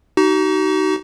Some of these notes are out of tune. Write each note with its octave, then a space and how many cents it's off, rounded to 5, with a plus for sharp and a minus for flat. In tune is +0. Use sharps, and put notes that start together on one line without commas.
D#4 +0 F#4 +45